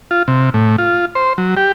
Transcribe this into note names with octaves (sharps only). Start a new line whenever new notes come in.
F4
C3
A2
F4
C5
F#3
G4